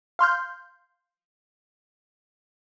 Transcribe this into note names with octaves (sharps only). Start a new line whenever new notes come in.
F5 C6 F6 G6